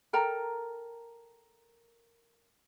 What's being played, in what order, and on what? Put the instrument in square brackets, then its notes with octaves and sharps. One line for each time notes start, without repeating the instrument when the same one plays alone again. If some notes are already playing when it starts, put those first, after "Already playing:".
[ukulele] A4 A#4 G5 A#5